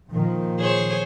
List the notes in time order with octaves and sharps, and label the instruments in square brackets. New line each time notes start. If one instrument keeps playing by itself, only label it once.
[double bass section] A#2 D#3 F3
[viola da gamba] G#4 C5 C#5